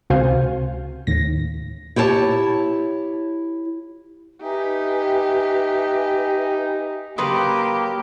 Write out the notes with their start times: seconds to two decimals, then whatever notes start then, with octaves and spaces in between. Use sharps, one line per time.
0.10 C#2 C3 F#4 C5 F5 G#5
1.07 D#2 A2 A#6
1.96 E4 G4 C#5 A5
4.42 D#4 G4 B4 E5 G#5
7.18 C#3 F#3 A#3 G4 B4 B5 C6 D#6